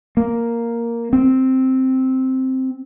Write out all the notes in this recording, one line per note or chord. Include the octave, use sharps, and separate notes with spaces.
A#3
C4